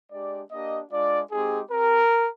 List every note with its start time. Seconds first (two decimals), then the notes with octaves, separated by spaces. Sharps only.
0.11 G#3 D4 G4 D5
0.51 A#3 D4 G4 D#5
0.91 G#3 D4 F4 D5
1.31 G#3 C4 D#4 G4 G#4
1.71 C4 G4 A#4